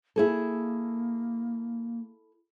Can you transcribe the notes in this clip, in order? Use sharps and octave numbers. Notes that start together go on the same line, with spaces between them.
A#3 E4 G#4 A4